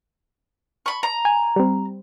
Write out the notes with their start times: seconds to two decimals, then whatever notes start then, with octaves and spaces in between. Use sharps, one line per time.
0.86 B5 C#6
1.03 A#5
1.25 G#5
1.56 G3 C4